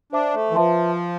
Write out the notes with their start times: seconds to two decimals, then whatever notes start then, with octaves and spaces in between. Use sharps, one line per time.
0.12 D4 C5 E5 A5 D6
0.34 A3
0.51 E3
0.55 F3 B4 E5 A5 C6